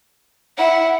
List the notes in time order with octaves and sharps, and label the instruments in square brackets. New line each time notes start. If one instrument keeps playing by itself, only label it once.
[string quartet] E4 [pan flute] F#5